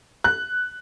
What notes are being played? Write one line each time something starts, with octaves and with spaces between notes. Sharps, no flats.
F#6